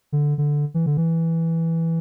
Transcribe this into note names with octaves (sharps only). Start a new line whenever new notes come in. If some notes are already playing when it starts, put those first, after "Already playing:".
D3
D3
E3
D3
E3